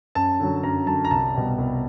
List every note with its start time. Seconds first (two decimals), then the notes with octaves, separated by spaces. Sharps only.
0.15 F#2 A5
0.40 D3 F#3
0.63 F#2 A#5
0.87 D3 F#3 A5
1.05 A#5
1.11 C2 A5
1.34 B2 G3
1.58 C2